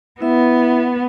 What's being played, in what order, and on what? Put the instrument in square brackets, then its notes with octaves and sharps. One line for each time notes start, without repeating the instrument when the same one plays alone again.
[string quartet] B3 [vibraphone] E4 E5